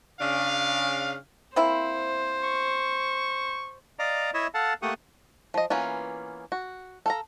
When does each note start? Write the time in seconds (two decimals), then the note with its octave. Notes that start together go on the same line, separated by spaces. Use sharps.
0.20 C#3 D4 F5
1.56 A#3 C4 E4 C5
2.43 C#6
3.99 D5 D#5 F5 A#5 D6
4.34 E4 C#5 D#5 E5
4.54 A4 F5 F#5 A5
4.82 A3 A#3 G4 F#5 C#6 D#6
5.54 F3 D#5
5.70 E3 A#3 B3 C#4 F4
6.52 F#4
7.06 A4 F5 A#5